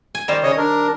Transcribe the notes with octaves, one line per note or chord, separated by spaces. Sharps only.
G#5
D#3 G3 C5
C#3 C#5 D#5
D4 A#4